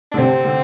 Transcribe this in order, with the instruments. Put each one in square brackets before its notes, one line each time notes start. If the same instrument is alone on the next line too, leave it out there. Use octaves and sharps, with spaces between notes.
[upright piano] D3 [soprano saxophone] D4
[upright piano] C3 [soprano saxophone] C4
[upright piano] D3